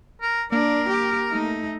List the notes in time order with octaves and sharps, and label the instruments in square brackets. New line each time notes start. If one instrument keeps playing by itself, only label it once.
[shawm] A#4
[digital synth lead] A#3 [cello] D4 [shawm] A#4
[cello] G4
A3 D#4